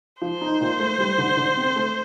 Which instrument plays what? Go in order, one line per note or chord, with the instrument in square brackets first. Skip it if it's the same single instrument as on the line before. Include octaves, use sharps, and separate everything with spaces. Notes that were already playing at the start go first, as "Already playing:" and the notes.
[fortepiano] F3 [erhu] C5
[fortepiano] D#4
A#2
A3
G3
D3
D3
C4
A3